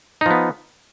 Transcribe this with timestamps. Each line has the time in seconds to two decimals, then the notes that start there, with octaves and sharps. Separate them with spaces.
0.21 D#4
0.26 F3
0.31 B3